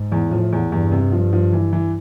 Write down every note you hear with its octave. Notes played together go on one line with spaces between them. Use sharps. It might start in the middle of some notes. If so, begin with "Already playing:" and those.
Already playing: G#2
E2
A2 F3
E2
E2 G2
C3
F3
F3
E3
E3